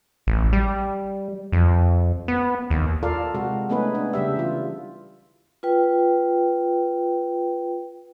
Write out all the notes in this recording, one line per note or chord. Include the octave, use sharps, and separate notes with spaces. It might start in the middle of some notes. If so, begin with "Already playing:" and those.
A1
G3
F2
B3
D#2
F4 A4 A#4 D5 F5
C3 G#3 F#4
A3 B3 C#4 D#4 G#4 B4
D4
C#3 G3 G4 E5
E3 F4
F4 B4 G5